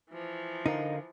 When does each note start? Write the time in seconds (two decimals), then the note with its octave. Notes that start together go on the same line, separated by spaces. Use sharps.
0.11 E3 F3
0.66 D3 D#4 A#4 F5